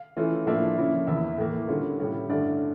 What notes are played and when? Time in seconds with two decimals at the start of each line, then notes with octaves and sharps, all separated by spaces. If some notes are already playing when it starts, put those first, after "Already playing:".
Already playing: F5
0.17 E3 A3 C#4 F4
0.46 A2 F3 A#3 D4 F4 E5
0.77 C#3 F3 A#3 C#4 E4
1.07 E2 E3 A#3 E4 E5
1.38 A2 E3 A#3
1.68 D3 G3 C#4 F4
2.00 A2 G3 C#4
2.29 G2 D3 A3 C#4 D5